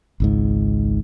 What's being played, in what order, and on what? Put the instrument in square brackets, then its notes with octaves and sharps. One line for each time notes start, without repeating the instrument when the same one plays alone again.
[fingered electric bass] G#1 C#2 G#2